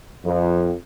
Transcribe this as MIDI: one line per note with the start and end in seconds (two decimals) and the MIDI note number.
0.25 0.72 41